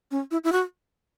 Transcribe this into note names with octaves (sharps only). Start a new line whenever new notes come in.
C#4
E4
E4
F#4